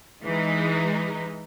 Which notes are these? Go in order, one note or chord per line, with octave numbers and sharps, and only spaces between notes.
E3 G#3 D#4